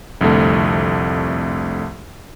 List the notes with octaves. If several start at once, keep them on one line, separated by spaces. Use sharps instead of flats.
C2 F2 D3 A3